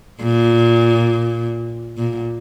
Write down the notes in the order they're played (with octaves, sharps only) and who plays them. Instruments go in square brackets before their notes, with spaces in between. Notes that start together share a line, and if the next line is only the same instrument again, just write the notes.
[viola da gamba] A#2
A#2